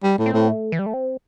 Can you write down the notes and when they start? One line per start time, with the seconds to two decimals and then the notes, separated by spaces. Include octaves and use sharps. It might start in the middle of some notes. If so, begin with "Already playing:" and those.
0.03 G3
0.18 A2
0.26 C4
0.33 A2
0.48 A3
0.72 E3
0.79 G3
0.86 A3
0.93 C4